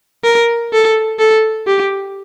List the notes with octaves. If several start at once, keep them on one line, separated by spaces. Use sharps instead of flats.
A#4
A4
A4
G4